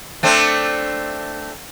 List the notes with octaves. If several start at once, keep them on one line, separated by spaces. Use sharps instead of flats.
A3 C4 D4